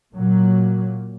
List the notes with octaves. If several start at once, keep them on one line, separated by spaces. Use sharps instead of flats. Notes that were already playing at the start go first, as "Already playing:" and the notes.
A#2 F#3